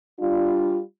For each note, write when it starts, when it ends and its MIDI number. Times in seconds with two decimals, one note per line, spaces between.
0.20 0.79 55
0.20 0.79 62
0.20 0.79 65